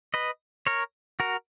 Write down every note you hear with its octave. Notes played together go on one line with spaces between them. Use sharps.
B4 D#5
A#4 C#5
F#4 A#4